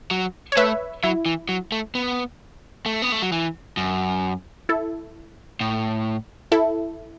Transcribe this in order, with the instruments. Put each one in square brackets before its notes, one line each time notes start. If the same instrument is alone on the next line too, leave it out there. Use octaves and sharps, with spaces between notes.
[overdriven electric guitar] F#3
[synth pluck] C#5
[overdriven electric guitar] A3 [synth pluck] B4 E5
[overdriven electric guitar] F#3 [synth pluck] E4
[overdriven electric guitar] E3
F#3
A3
B3
A3
B3
A3
F#3
E3
F#2
[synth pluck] E4 A4
[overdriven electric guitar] A2
[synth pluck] E4 A4